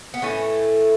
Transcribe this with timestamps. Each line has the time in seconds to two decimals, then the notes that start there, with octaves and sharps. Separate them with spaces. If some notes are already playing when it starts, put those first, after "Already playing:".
0.14 B3
0.22 A2 E3 A3 C#4